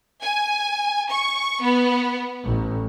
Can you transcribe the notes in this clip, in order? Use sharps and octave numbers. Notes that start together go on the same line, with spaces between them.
G#5
C#6
B3
A1